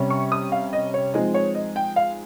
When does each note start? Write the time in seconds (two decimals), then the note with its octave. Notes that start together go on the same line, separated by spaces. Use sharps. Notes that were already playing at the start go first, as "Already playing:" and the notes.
Already playing: C3 G3 C#4
0.10 C#6
0.32 D#6
0.52 F5
0.73 D#5
0.94 C#5
1.14 F3 G#3 C4 D#4 D#5
1.34 C#5
1.55 D#5
1.76 G5
1.96 F5